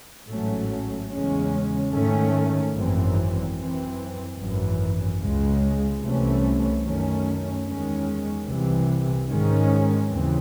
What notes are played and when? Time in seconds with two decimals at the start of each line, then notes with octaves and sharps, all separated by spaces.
0.27 A1 G#2 F#3 A3 C#4
1.09 E2 C#3 G#3 C#4
1.91 G#2 D#3 A3 C#4
2.73 G#1 F#2 E3 C4
3.54 F#2 E3 C4
4.36 G#1 F#2 E3
5.19 C#2 C#3 G#3
6.00 C2 C3 E3 A3 C#4
6.82 F#2 D#3 A3 C#4
7.63 E2 D#3 G#3 C#4
8.46 C2 C3 E3
9.27 G#2 D#3 G#3 C#4
10.09 D#2 C#3 E3 C4